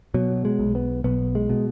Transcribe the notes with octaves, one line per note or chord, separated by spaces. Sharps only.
B2 F#3
G#3
B1
B3
B1 B3
G#3
B2